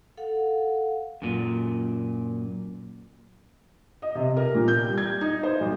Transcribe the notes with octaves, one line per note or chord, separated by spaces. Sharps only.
A4 F5 F#5
F#2 A#2
D#5
C3
A#4
A#2
G6
G3
G#6
D#4
C5
B1